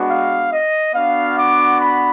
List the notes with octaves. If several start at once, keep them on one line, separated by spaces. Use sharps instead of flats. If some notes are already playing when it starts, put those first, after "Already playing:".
Already playing: G#3 B3 D4 F#4
F5
D#5
B3 D4 F#4 F5
D6
B5